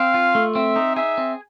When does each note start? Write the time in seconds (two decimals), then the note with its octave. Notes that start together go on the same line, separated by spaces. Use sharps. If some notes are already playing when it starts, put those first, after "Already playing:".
Already playing: C4 F5
0.14 F4
0.35 A3
0.55 C4 E5
0.76 D#4
0.96 G#4 E5
1.18 C4